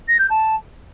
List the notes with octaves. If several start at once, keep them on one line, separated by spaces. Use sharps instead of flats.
A#6
G6
A5